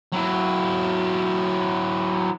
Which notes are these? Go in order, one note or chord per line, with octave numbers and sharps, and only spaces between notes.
F#3 E4